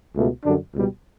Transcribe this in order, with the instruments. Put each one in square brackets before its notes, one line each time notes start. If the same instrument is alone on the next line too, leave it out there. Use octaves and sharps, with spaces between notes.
[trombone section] C#2 B2 A3
F#2 D3 G3 D4
C#2 B2 G3